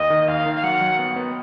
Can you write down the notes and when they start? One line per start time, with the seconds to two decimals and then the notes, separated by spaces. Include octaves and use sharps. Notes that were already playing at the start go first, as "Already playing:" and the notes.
Already playing: D#2 D#5
0.10 D#3
0.28 D#2 F5
0.46 D#3
0.56 F5
0.63 F#3 F#5
0.81 F#3
0.99 B3
1.16 B3